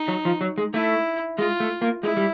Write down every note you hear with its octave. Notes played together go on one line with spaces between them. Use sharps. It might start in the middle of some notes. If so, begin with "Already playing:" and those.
Already playing: D#4
F#3
F3
F#3
G#3
A3 E4
G#3 F4
A3
A#3
G#3 E4
G3